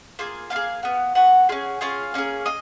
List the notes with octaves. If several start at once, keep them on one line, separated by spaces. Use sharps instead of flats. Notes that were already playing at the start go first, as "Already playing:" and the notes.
A#3 F4 G#4
A#3 F4 F5
G#4
B3 F#4
B3 F#4 F#5
C#4 F4 G#4
C#4 F4 G#4 F5
A#3 C#4 G#4
A#3 D#5